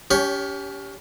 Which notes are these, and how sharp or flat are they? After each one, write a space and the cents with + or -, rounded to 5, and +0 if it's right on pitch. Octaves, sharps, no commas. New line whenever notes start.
C#4 +35 G4 +0 C#5 +5